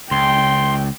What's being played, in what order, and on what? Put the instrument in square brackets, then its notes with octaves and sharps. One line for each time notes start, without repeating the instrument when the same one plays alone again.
[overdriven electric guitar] C#2 [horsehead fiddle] G5 [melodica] C6